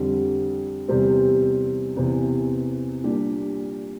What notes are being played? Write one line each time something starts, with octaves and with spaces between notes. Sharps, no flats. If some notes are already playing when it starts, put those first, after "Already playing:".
Already playing: F2 D3 G3
E2 C3 G3 C4
E2 C3 E3
A#2 G3 D4 G4